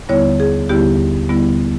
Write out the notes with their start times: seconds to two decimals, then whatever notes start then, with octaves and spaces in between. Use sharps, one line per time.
0.09 D#2 D3 G3 B3 E4 C#5
0.40 G#4
0.69 D#2 D3 G3 B3 E4 G4
1.29 D#2 D3 G3 B3 E4